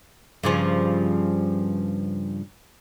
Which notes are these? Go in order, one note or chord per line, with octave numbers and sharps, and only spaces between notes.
G2 C#3 F3